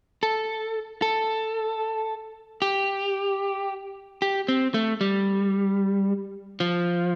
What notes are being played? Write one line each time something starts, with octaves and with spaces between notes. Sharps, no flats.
A4
A4
G4
G4
C4
A3
G3
F3